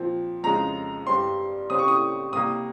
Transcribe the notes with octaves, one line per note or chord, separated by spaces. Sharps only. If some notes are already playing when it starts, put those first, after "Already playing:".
Already playing: A#2 F3 C4
F2 C#3 G#3 A#5
G2 G3 C4 C6
C#3 G3 C4 D#6
C#6
D#6
C3 G3 A#3 D#6